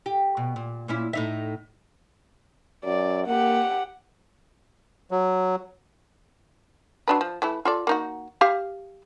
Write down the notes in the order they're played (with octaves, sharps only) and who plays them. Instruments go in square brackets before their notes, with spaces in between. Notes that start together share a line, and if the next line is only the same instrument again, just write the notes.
[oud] G4
B2
A#2
A#2 C#4 E4
A2 D#4 E5
[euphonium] F#2 [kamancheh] D5
[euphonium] A#3 [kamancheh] G4 F#5
[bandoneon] F#3
[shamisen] F#3 D4 B4
F3
E3 A3 E4
F4 A4 D5
A#3 D#4 F#4
G4 E5 F5